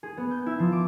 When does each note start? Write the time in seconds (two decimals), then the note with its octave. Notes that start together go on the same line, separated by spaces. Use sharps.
0.03 G#4
0.17 B3
0.31 G6
0.46 E4
0.59 F3
0.72 D6